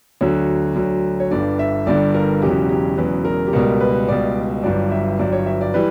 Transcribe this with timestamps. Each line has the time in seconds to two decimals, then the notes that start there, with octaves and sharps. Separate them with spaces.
0.21 D2 D3 F#3 C#5
0.76 D2 D3 F#3
1.20 C#5
1.31 G1 G2 D3 D5
1.59 E5
1.86 G1 G2 D3 D5
2.14 A#4
2.42 E1 E2 C#3 F#3 G4
2.69 G4
2.97 E1 E2 C#3 F#3 B4
3.25 A#4
3.47 G4
3.53 C#2 B2 G3 A#4
3.80 B4
4.08 C#2 B2 G3 D5
4.63 G1 G2 F#3 D5
4.91 E5
5.19 G1 G2 F#3 D5
5.33 C#5
5.46 E5
5.61 D5
5.74 E3 G3 B4